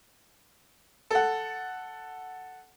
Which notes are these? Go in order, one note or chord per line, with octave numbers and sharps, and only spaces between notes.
A4 F#5